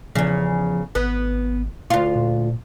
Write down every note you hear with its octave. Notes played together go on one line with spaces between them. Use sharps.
E2 C#3 F3
G#1 B3
D2 F4
A#2